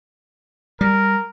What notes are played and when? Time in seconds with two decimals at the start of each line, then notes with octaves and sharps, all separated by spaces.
0.81 G3 A#4